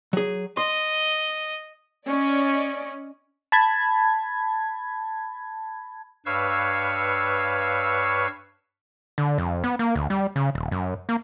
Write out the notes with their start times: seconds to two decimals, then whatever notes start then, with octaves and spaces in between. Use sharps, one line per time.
0.13 F#3 G#4
0.57 D#5 C6
2.07 C#4 D5 D#5
3.52 A5 B5 G#6
6.26 G2 B4 C#5 F5 C#6 E6
9.18 D3
9.38 F2
9.64 B3
9.79 A#3
9.95 D2
10.10 G3
10.36 C#3
10.55 D#1
10.71 F#2
11.09 A#3